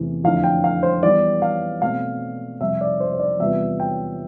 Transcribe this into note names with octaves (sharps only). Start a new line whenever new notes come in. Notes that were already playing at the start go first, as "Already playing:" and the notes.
Already playing: E2 C3 E3 A3
F2 D3 A3 E4 F5
G5
F5
C5
E3 G3 B3 D5
F5
B2 A3 C4 F5
F2 C3 G3 E5
D5
C5
C5
D5
E2 C3 G3 B3 F4 E5
G5